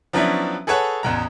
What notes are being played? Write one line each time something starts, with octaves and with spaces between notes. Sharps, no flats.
F3 F#3 B3 C#4 D4 E4
G#4 A4 B4 C#5 F#5 A5
A1 E2 A#5